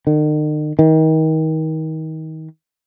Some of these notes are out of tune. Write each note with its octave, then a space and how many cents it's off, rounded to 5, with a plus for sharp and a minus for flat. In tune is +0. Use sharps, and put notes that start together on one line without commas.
D#3 -40
D#3 +30